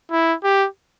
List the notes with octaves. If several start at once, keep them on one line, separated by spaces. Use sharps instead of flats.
E4
G4